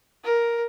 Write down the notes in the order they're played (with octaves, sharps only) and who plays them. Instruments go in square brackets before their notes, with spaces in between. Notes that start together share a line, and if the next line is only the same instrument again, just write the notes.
[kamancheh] A#4